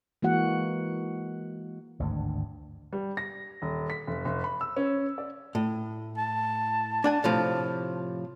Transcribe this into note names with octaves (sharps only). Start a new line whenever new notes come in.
E3 G#3 A#3 F#4 F#5
G#1 D2 G2 D3
G3
A#6
D#1
B6
F1
F1
B5
E6
C#4
D5
A2
A5
D4 F#5 G#5
A2 C3 F3